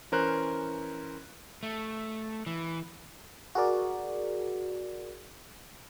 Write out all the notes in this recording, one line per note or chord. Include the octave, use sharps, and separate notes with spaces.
E3 C#4 A#4 C5 F#6
A3
E3
F#4 G#4 A#4 D5